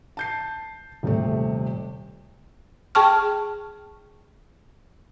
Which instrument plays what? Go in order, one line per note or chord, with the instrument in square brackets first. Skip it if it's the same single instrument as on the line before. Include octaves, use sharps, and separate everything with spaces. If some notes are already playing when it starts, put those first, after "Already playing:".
[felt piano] A5 G6 C7
D#1 C3 A3
[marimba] G#4 G5 A5 C#6 F6